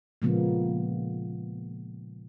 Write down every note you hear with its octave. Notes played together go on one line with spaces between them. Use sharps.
A#2 C#3 F3 G#3 A#3 B3